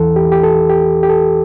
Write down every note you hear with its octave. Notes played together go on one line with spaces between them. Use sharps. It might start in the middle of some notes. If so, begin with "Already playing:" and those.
Already playing: E2 E3 A4
G4
G4
A4
G4
G4
A4